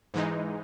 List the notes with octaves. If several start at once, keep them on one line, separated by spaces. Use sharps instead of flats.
G#2 E3 G#3 D#4